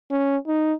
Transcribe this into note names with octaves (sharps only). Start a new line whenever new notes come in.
C#4
D#4